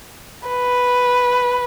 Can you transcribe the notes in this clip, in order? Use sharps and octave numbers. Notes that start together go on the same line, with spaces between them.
B4